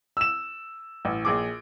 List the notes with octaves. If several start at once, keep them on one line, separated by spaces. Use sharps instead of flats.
E6 E7
A1
A#1 G#4 D6